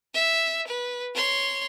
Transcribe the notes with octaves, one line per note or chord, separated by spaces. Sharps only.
E5
B4
C#5 C6